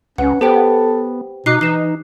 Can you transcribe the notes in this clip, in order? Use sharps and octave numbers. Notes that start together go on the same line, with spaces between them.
C#2 C#4 B4 F#5
B3 G4 A4 C5 G5
B2 D#4 D6 F#6 C7
E3 D#4 C7 E7